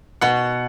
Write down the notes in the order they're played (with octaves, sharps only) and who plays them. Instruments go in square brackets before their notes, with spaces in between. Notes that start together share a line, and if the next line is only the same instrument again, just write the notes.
[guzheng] B2 [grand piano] F#5